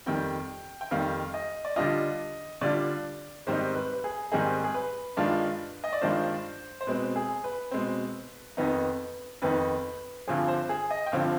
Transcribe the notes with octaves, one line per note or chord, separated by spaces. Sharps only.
F2 D#3 G3 G5
G5
F2 D#3 G3 F5
D#5
D5
D3 G3 D4 F4 D#5
D3 G3 D4 F4 D5
G#2 D#3 G3 C4 D#4 C5
B4
B4
G#4
G#2 D#3 G3 C4 D#4 G#4
G#4
B4
G2 D#3 G#3 D4 F4
D#5
D5
G2 D#3 G#3 D4 F4 C5
C5
B2 G#3 C4 B4
G#4
B4
B2 G#3 C4
F2 D#3 B3 D#4
F2 D#3 B3 D#4 B4
G2 D3 F3 C4 G#4
C5
G#4
D#5
G5
G2 D3 F3 C4 F5